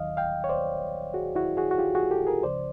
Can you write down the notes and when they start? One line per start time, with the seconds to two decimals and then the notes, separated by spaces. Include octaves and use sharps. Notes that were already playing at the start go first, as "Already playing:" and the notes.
Already playing: D#2 D#3 F#3 D#5 F5
0.17 F5 G5
0.44 C#5
0.49 C5 D5
1.14 F#4 G#4
1.36 E4 F#4
1.57 F#4 G#4
1.71 F#4
1.78 F4 G4
1.95 F#4 G#4
2.11 G4 A4
2.27 G#4 A#4
2.43 C#2 C#3 F3 C5 D5